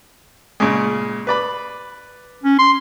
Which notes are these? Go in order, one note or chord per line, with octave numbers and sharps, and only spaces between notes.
A#2 C#3 G#3
B4 D5 B5
C#4
C6